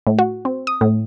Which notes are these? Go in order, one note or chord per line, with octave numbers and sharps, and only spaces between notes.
A2
F#4
C4
D#6
A2